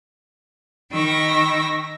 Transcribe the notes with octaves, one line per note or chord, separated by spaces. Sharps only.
D#3 G5 B5 C#6 E6 A#6